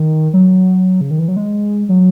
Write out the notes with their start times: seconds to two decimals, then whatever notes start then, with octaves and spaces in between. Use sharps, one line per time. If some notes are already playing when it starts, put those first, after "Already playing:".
Already playing: D#3
0.33 F#3
1.01 C#3
1.11 D#3
1.19 E3
1.28 F#3
1.37 G#3
1.89 F#3